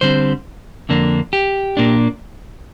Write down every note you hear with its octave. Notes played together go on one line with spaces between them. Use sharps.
D3 G3 C4 C5
F2 D3 A#3 D4
G4
A#2 A#3 D4